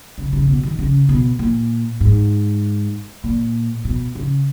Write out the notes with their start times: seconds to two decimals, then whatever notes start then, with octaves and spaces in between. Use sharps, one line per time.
0.18 C#3
0.33 C#3
0.48 B2
0.63 D#3
0.79 C#3
1.09 B2
1.39 A#2
2.01 G#2
3.24 A#2
3.85 B2
4.15 C#3